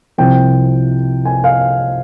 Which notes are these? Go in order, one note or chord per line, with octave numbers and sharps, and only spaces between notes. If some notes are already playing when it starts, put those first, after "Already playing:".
C2 C3 F3 G5
G#5
F5